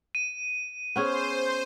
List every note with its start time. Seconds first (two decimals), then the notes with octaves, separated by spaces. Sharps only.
0.15 D#7
0.96 B3 C#4 G#4 C5